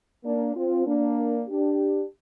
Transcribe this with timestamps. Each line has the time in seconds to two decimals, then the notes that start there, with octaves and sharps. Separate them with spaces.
0.24 A#3 D4
0.55 C4 F4
0.86 A#3 D4
1.48 D4 G4